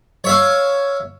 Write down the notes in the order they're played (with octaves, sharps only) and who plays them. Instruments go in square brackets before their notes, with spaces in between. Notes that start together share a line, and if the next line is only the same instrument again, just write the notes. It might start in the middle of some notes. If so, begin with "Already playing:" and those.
[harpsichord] C#5 E5 F5